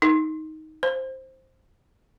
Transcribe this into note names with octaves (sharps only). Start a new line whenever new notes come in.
D#4
C5